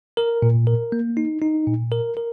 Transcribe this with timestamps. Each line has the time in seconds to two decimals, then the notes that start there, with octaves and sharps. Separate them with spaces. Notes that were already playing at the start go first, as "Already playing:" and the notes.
0.17 A#4
0.42 A#2
0.67 A#4
0.92 A#3
1.17 D#4
1.42 D#4
1.67 A#2
1.92 A#4
2.17 A#4